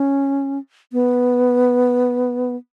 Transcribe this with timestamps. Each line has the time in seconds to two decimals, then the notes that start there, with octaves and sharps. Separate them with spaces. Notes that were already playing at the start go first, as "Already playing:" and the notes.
Already playing: C#4
0.93 B3